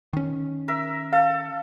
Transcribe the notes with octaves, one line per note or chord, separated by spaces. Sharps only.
D#3 C#4
A#4 E5
A4 F5